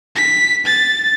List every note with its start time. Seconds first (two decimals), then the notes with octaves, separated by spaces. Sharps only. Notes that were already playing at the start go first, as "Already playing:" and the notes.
0.16 B6
0.66 A6